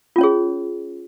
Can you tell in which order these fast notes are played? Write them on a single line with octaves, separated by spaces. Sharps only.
F4 C#4 C#5 G#4